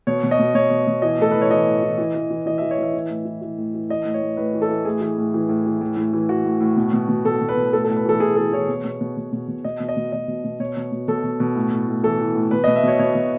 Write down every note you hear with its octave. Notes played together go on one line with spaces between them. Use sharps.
B2 C#5
B2
D#5
B2
B2 C#5
B2
B2
E3 D#5
A2 A4
E3 B4
C#5
E3 D#5
A2
E3
E3
E3
E3
E3 D#5
E3 E5
C#5
E3 E5
E3
A2
E3
E3
A2
E3
E3 D#5
A2
C#5
A2
A2 B4
E3
A4
E3
A2 G#4
E3
A2
E3
A2
E3
A2
A2
E3
A2 F#4
A2
A2
B2
B2
B2
B2 A4
B2
B4
B2
A2 A4
A2 A4
B4
E3 A4
A2 G#4
E3 A4
E3 C#5
B2
B2
B2
B2
B2
B2
B2 D#5
B2
D#5
B2
B2 D#5
B2
B2
B2 C#5
B2
B2
B2 A4
B2
B2
A2
A2
A2
E3 A4
E3
A2
B2 B4
B2 D#5
E5
B2 C#5
B2 C#5
B2